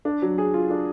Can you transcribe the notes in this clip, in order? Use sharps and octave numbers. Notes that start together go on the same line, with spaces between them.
D4
F#3
G#4
F4
D4